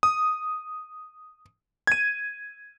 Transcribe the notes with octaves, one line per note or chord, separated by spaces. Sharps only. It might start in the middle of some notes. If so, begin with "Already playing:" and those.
D#6
G#6 D#7